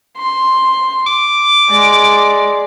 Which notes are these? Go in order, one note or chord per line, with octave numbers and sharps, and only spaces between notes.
C6
D6
G#3 D5